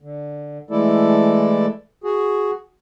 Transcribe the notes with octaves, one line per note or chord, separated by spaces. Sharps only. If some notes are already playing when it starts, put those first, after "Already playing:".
D3
E3 G#3 A3 E4 A4 D5
F#4 G#4